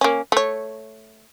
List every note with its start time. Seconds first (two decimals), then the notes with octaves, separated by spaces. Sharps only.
0.01 A#3 C#4
0.32 A3 C#5